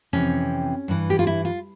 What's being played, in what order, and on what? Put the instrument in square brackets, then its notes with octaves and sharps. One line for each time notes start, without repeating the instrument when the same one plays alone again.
[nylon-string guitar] F2 C3 E3 C#4
G2 E3
G4
F4
E4
F4